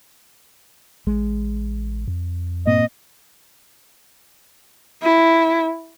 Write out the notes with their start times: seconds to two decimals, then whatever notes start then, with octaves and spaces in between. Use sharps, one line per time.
1.07 A1 G#3
2.08 F2
2.66 G2 A#2 A#3 C4 D#5
5.02 E4